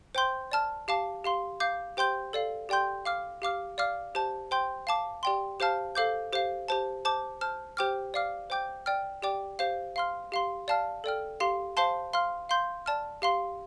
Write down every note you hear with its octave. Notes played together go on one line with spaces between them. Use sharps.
C5 G5 C6 G6
D5 A5 F6
G4 F5 A5 D6
G4 F5 C6
F5 D6 G6
G4 C5 G5 C6 G6
A4 D5 F5
G4 D5 G5 C6 G6
F5 D6 F6
G4 F5 D6 F6
D5 F5 D6 F6
G4 C5 A5
C5 G5 C6 G6
F5 A5 D6
G4 D5 G5 C6
G4 C5 F5 A5 F6
A4 C5 F5 D6 G6
G4 C5 F5
G4 C5 A5
C5 A5 D6
C5 A5 F6
G4 C5 G5 D6 F6
D5 F5 D6 F6
C5 G5 D6 G6
D5 G5 F6
G4 D5 G5 D6
G4 C5 F5
F5 C6 F6
G4 F5 C6
D5 F5 A5 F6
A4 D5 G5 F6
G4 F5 C6
C5 F5 A5 C6 G6
F5 C6 F6
F5 C6 G6
D5 A5 F6
G4 F5 C6